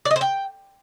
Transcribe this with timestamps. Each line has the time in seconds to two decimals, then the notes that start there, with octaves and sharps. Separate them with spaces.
0.05 D5
0.11 D#5
0.16 C5
0.21 G5